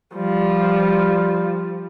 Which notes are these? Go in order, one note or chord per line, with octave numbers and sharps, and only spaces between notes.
F3 G3